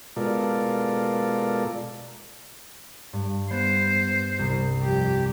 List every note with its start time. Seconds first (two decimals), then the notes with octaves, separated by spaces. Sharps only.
0.16 B2 G#3 F4 A4 A#4 D5
3.13 G2
3.51 B3 C5
4.39 C2 C3
4.83 F2 G4